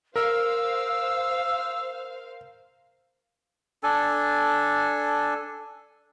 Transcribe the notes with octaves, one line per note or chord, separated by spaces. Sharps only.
A#4 C5 F5 E6
D4 A4 G#5